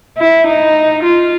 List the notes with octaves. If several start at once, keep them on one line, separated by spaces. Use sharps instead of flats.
E4
D#4
F4